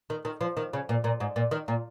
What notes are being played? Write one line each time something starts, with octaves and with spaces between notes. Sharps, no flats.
D#3
D#3
F3
D#3
C#3
A#2
A#2
G#2
A#2
D#3
A#2